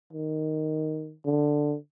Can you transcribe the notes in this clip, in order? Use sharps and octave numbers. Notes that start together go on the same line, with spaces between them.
D#3
D3